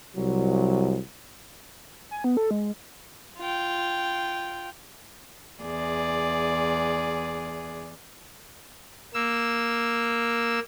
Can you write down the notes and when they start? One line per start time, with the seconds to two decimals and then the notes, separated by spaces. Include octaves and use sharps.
0.17 C2 F#3
2.11 G#5
2.24 B3
2.37 A4
2.51 G#3
3.38 F4 G5
5.63 E2 G#4 D5
9.14 A#3 E6